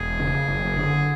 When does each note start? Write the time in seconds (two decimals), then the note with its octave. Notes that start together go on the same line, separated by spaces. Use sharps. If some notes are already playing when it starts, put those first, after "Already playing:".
Already playing: E1 G#4
0.20 C#3
0.49 F#1
0.77 D3